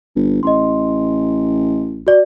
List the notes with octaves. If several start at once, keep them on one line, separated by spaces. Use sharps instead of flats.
G1
A1 D#5 C6
F#4 D5